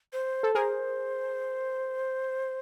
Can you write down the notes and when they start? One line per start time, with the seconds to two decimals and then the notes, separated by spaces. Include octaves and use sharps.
0.13 C5
0.43 A4
0.55 G#4 A#4 C5